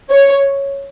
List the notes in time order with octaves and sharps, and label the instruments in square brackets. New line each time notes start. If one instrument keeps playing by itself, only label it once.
[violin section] C#5